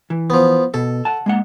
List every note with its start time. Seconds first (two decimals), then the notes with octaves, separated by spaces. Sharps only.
0.10 E3
0.30 F3 B3
0.74 B2 A4
1.05 F#5 A5
1.26 G#3 A#3 F#5